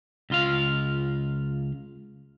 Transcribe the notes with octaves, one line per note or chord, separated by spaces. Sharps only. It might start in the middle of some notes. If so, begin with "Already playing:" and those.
C#2 F4 F5